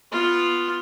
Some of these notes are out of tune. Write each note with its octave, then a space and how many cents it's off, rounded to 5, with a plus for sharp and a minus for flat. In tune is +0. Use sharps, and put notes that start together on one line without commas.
B3 +0 F4 +0